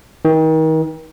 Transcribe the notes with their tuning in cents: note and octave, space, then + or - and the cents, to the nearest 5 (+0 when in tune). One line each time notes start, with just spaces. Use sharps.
D#3 +35